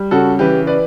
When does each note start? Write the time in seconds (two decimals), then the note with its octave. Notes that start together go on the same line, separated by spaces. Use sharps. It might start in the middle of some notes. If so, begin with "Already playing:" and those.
Already playing: G3
0.11 C#3 F#4 A4
0.39 E3 G4 B4
0.67 B4 D5